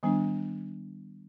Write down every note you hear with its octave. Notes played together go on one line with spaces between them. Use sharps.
D#3 G3 B3 D4